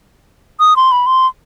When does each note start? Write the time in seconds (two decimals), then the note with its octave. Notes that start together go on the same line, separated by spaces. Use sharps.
0.60 D#6
0.76 C6
0.92 B5
1.07 C6